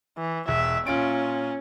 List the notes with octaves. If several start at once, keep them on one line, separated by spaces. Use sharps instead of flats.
E3
E1 E5
A#2 C#4 F4 D7